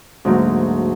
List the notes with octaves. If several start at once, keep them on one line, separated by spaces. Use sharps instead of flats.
D2 G#2 F#3 A#3